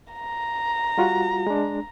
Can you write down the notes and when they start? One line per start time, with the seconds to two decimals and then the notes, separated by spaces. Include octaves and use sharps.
0.13 A#5
0.98 G3 F4 F#4
1.47 G#3 D4